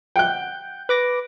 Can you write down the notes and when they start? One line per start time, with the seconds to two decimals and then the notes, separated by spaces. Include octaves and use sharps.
0.16 F#5 G5 F#6 G6
0.89 B4 D6 A#6